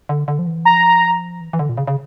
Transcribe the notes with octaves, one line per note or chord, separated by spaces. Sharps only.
D3
D3
F3
E3
F3 A#5
E3
E3
D3
A#2
C#3
C#3